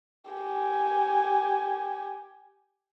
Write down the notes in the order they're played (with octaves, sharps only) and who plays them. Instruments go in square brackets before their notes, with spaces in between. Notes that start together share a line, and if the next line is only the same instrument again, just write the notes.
[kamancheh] G4 G#5